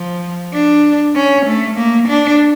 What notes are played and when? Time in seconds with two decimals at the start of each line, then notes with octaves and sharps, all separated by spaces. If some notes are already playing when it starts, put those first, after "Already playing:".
Already playing: F3
0.54 D4
1.16 C#4
1.46 A3
1.77 A#3
2.09 D4